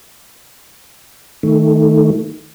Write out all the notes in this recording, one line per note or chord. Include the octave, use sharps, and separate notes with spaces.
D#3 A3